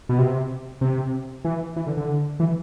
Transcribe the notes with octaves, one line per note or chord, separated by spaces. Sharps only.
B2
C3
C3
E3
E3
D3
D3
E3